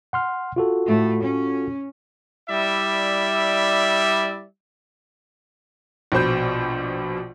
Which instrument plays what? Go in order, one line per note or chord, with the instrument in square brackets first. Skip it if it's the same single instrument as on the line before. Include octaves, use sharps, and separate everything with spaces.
[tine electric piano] F#5 C6 F6
F4 F#4 A4
[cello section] A2 A3
C#4
[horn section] G3 E4 D5 E5
[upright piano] A#1 B2 C5 G6